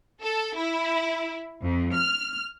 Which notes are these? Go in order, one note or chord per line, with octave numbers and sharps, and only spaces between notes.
A4
E4
F2
F6